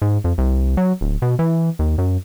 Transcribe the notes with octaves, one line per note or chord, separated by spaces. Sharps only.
G#2
F2
C2
F#3
D1
B2
E3
D#2
F#2